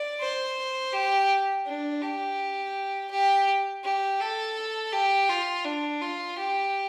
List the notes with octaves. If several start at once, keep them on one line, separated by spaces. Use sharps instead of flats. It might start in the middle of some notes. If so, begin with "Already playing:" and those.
Already playing: D5
C5
G4
D4
G4
G4
G4
A4
G4
F4
D4
F4
G4